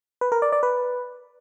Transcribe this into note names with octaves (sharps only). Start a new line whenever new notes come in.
B4
A#4
D5
D5
B4